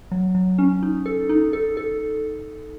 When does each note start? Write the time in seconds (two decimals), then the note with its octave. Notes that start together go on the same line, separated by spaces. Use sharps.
0.11 F#3
0.35 F#3
0.58 C#4
0.83 D#4
1.06 A4
1.29 D#4
1.53 A4
1.77 A4